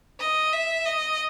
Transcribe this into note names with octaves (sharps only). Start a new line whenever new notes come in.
D#5
E5
D#5